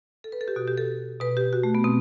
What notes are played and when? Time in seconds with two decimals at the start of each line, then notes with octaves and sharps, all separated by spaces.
0.24 A4
0.32 B4
0.41 A4
0.48 G4
0.56 B2 F#4
0.68 G4
0.77 A4
1.20 B2 B4
1.37 G4
1.53 F#4
1.63 A3
1.75 B3
1.84 B2 C4